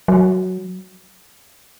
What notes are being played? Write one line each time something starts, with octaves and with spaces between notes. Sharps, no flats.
F#3